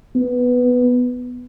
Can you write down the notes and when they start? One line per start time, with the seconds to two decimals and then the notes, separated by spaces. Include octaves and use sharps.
0.16 B3